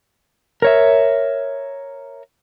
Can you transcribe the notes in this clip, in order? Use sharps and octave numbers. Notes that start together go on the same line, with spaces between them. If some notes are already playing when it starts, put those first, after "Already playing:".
A#4 C#5 E5